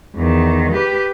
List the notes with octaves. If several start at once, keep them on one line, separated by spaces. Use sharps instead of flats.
E2 D#3
G4 B4